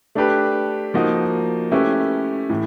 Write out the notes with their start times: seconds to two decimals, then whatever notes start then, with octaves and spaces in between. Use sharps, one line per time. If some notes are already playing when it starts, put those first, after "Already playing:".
0.15 A3 D4 G4 B4
0.94 F3 A#3 D#4 F#4
1.72 A3 C#4 E4 G4 B4
2.49 A2 E3